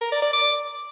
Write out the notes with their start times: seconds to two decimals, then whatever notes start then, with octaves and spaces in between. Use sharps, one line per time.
0.01 A#4
0.12 D5
0.22 D5
0.33 D6